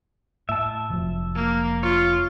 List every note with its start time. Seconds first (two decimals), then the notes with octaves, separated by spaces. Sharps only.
0.49 A2 E5 A5
0.90 F1 F3 F#3
1.35 A#3
1.83 F4 C#5